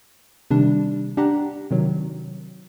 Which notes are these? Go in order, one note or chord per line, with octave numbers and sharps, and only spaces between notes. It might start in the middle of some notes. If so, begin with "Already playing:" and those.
C3 D#3 G3 D4
D4 G4 F#5 A#5
C3 D#3 F#3